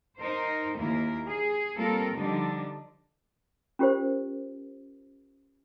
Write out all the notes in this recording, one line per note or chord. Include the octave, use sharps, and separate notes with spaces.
D#4 A#4 C5
D#2 A#3 E4 A#4
G#4
G3 A#3 C4 F4 A4 A#4
D3 F3 G3 D4 D#4
C#4 F4 G4 A#4 C5 D5